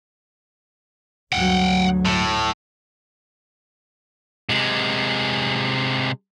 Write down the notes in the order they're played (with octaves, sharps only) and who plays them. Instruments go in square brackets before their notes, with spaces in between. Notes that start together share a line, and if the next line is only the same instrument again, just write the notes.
[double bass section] D2 G2 F#3 [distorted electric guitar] F#5 G5
[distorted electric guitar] A2
C3 G#3